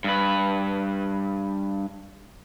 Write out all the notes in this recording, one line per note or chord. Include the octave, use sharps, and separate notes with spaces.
G2 B4